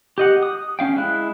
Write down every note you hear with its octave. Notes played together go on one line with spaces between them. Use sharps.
G4 D#5 F#5
D#6
C#4 F5 G5
G#3 E4 F#6